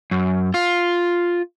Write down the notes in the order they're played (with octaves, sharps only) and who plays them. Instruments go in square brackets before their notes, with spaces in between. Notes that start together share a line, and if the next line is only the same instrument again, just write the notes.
[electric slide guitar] F#2
F4